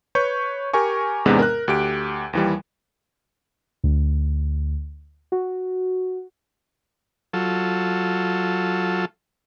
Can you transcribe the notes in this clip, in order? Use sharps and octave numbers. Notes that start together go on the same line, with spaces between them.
B4 C#5 C#6 G6
G4 A#4 G#5 C#6
E2 G#2 C3 G#3 B3 D4
A#4 F#6
D2 G4 D7
D#2 E3 G3
D2
F#4
F#3 F4 A4